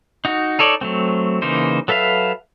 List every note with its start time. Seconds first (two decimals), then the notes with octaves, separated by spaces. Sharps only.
0.25 D#4 F#4
0.59 D#4 A4 C#5 D5
0.81 F#3 A3 C4
1.42 C#3 E3 A#3 D#4 C5
1.88 F#3 A4 B4 E5 F5